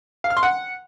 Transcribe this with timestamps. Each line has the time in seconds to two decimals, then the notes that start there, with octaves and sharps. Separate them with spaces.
0.24 F5
0.30 F6
0.37 C6
0.43 F#5